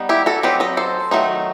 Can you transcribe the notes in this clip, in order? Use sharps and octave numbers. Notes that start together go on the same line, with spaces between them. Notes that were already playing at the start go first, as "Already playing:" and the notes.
Already playing: G3 B3 D#4
E4 G4
F#4 A4
F#3 C4 D#4 G4 B4
B4 D#5
A4 C5
D#3 F#3 A3 D#4